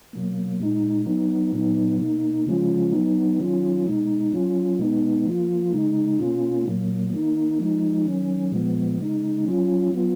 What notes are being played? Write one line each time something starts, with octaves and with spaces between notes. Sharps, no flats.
B2 F#3 A#3
A#2 G#3 D#4
F#3 B3 D#4
A#2 F#3 B3 D#4
B2 A#3 D#4
C#3 F3 G#3 C#4 F4
F#3 B3 D#4
D#3 F#3 C#4 F4
B2 G#3 D#4
F#3 C#4 F4
B2 G#3 B3 D#4
F3 A#3 F4
C#3 G#3 D#4
B2 A#3 C#4 F4
A#2 F#3 A#3
D#3 A#3 D#4
F3 G#3 D#4
D#3 F#3 C#4
A#2 F3 G#3 B3
C#3 G#3 D#4
F#3 C#4 F4
F#3 B3 F4